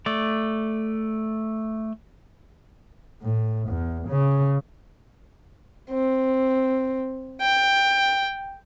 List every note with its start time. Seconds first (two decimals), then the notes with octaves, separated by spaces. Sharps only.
0.06 A3 D5
3.23 A2
3.69 E2
4.09 C#3
5.90 C4
7.41 G5